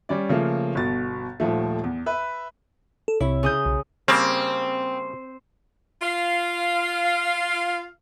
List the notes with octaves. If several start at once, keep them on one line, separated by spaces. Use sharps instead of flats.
G3 C#4 D5
C#3 F3 A3 A#3
G1 B2 A6
D#1 D#2 F3 A3
E2
B4 E5
A4
C2 C3 E4 C#5
C#3 D#6 G6
B1
C#3 G3 A#3 C4
F4 F5